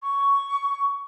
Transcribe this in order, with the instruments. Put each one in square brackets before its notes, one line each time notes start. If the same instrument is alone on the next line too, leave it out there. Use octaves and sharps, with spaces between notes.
[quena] C#6